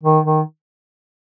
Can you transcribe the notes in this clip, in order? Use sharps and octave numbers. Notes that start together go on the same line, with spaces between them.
D#3
D#3